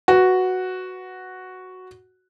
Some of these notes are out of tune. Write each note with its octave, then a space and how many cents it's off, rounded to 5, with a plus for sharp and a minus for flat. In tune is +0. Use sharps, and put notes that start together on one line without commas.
F#4 +0 B4 +0